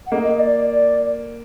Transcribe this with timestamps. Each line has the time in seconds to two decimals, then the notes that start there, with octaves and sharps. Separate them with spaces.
0.06 F#5
0.11 A#3 D#5
0.28 D#5
0.39 D5
0.66 D5